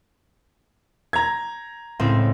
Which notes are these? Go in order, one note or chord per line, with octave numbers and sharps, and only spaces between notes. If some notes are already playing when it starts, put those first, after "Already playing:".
A#5 G#6
C#2 A2 C4